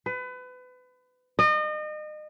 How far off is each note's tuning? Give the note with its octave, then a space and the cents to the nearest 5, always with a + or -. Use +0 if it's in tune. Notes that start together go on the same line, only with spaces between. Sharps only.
B4 +30
D#5 -35